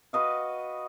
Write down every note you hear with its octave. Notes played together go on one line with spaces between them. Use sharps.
F#4 B4 D#5 F5